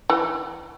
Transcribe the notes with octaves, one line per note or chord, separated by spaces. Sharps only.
E3